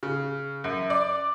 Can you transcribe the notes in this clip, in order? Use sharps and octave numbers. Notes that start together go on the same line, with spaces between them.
C#3
F#2
D5